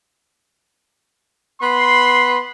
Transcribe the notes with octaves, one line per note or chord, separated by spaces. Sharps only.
B3 B5 C6